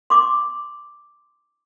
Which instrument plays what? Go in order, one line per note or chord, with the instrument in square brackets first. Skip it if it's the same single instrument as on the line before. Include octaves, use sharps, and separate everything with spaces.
[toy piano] C6 D6